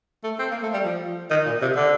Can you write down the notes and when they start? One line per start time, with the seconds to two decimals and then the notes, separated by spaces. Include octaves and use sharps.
0.24 A3
0.39 C4
0.51 A#3
0.63 A3
0.73 G3
0.85 F3
1.30 D#3
1.46 A#2
1.62 C3
1.76 D3